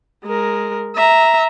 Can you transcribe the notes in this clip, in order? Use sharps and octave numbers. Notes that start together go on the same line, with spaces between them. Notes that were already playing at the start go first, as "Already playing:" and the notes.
G#3 A#4
E5 A#5